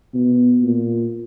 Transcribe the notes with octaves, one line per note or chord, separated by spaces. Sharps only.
B2
A#2